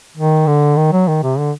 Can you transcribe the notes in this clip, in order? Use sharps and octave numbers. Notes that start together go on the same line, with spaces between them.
D#3
D3
D#3
F#3
D#3
C3
D3